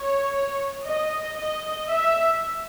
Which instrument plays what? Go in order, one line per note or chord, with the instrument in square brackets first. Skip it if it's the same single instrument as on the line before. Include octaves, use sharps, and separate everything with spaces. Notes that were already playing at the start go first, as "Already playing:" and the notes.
Already playing: [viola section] C#5
D#5
D#5
E5